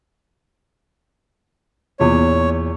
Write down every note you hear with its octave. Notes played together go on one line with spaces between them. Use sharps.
E2 A#2 C#5